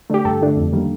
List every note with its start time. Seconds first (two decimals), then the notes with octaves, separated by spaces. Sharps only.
0.10 D3 A3 D4 G4
0.25 G2 A4
0.41 D3 A3 D4
0.57 F2
0.73 D#3 G3 A#3